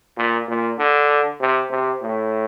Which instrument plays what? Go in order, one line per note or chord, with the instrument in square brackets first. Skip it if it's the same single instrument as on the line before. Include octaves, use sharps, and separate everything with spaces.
[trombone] A#2
A#2
D3
C3
C3
A2